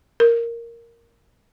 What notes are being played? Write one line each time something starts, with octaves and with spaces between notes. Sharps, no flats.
A#4